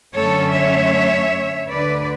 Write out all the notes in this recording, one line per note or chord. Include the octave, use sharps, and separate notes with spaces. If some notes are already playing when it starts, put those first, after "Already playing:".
F#2 D3 A3 C#4 A4 C#5
C#5 E5
D2 D3 A3 B4 D5